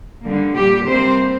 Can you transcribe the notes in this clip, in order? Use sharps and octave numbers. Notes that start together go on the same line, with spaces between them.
D3 G3 A#3
A#2 G3 A#3 G4
C3 G3 A#3 C4 C5